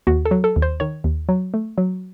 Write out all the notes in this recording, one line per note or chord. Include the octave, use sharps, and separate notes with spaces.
D#2 F#4
A4
F#3
A4
D#2
C5
D#3 C#5
D#2
F#3
A3
F#3